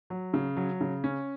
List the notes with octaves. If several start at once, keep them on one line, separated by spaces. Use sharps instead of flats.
F#3
C#3
F#3
C#3
C#4